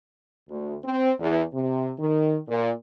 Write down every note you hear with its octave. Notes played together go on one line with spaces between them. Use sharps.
D2
C4
E2
C3
D#3
A#2